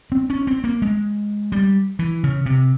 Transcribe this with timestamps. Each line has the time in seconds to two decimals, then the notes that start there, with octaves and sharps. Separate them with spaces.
0.12 C4
0.30 C#4
0.47 C4
0.64 A#3
0.82 G#3
1.52 G3
1.99 E3
2.24 C#3
2.46 C3